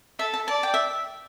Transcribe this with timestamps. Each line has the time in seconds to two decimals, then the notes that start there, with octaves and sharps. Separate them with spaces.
0.19 A4 E5
0.34 A5
0.48 D5 A5
0.63 G5
0.74 E5